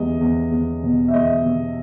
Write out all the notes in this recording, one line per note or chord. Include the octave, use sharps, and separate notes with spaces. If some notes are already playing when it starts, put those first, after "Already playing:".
Already playing: E2 G3 D#5
E2
E2
B2
E5
E2 D#5
B2